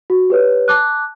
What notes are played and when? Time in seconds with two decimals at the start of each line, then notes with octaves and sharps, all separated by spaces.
0.10 F#4
0.30 G4 B4 C#5
0.68 A5 D6 F#6